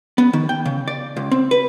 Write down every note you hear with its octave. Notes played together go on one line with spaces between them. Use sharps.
B3
D#3
G5
C#3
D5
C#2
C4
B4